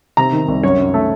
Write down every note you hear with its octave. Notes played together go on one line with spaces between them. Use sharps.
C3 A#5
D#3
C2
F#2 C#5
F#2
A3